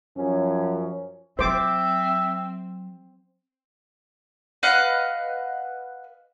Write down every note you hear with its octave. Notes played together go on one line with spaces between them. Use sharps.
F#2 F3 C#4
F#3 C4 C5 E5 D6
B4 D#5 F5 F#5